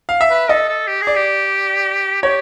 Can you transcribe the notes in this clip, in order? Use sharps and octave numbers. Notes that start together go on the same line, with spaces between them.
F5
E5
B4
A4 D#5
A4
G4
G#4
D5
G4
G4 C#5